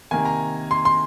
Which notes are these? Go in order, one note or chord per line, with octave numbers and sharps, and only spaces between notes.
C3 D#3 A#3 G#5
A#5
C6
C6